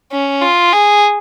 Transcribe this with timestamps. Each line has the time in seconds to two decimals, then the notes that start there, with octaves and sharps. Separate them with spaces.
0.12 C#4
0.42 F4
0.73 G#4